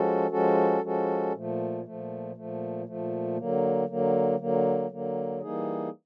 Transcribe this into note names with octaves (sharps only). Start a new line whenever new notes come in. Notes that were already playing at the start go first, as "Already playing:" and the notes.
Already playing: F3 G#3 C#4 F#4 A4
F3 G#3 C#4 F#4 A4
F3 G#3 C#4 F#4 A4
A#2 F3 A3
A#2 F3 A3
A#2 F3 A3
A#2 F3 A3
D3 F#3 A#3
D3 F#3 A#3
D3 F#3 A#3
D3 F#3 A#3
E3 G3 A#3 D#4 G#4